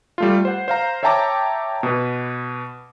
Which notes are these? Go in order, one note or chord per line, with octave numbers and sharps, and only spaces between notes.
G3 A3 F4
C5 F#5
C5 F5 A#5
C#5 E5 G5 A5 A#5 D6
B2 B4